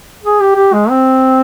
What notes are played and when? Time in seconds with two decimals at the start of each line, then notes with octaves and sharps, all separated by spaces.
0.24 G#4
0.40 G4
0.56 G4
0.73 G#3
0.90 C4